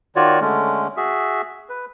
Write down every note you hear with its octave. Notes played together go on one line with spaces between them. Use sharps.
D#3 F4 F#4 C#5 D5
D3 G#3 A3 C#4
F#4 G#4 E5
B4